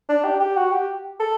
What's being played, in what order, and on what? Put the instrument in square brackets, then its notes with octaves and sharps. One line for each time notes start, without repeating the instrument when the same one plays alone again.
[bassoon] D4
G4
G4
F#4
G4
A4